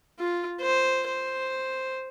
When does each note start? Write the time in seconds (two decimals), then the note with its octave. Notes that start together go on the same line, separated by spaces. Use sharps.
0.19 F4
0.61 C5
1.08 C5